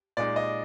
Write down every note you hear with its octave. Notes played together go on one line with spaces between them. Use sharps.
A#2 G#3 D#4 D5
D#5